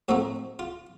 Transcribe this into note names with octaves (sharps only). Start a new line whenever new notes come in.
A2 F3 A3 C4 D#4 F#4
F4